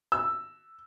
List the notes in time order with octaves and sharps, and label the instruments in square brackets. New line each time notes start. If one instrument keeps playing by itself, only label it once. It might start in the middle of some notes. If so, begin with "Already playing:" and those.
[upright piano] E6